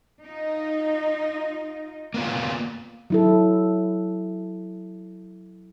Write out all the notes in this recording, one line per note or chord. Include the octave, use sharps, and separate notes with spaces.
D#4 F4
A#3 B3 F4
F#3 E4 A4